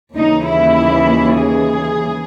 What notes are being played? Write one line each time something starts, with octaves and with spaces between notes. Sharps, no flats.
D#2 C#3 E3 D#4
E4
G#4